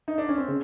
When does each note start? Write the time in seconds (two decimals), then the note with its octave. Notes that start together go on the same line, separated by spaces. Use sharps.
0.08 D#4
0.18 D4
0.29 C#4
0.38 C4
0.48 C#3